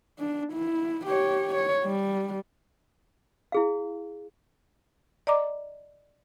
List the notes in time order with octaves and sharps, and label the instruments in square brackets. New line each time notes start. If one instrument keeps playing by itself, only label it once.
[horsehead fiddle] D4
E4
G4 C#5
C#5
G3
[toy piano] E4 G#4 F5
[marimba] D5 D#5 A#5 D6